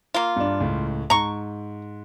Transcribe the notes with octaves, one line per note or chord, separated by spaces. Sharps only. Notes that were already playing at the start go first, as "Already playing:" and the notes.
A#3 F4
G2 D4
C#2 A2
G#2 A#5 C#6